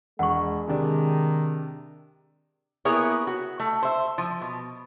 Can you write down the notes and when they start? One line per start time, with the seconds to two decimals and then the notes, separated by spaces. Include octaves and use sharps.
0.19 E1 G#3 F#5 C#6
0.68 C3 D#3 D4
2.85 A#3 B3 E4 G#4 A#4 C#5
3.27 F#4
3.60 A3
3.83 C5 E5
4.18 F3
4.42 B2